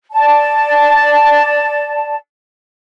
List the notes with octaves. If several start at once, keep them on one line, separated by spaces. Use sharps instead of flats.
D5 A5